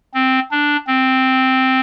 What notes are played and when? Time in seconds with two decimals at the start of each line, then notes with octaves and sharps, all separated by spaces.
0.14 C4
0.51 D4
0.87 C4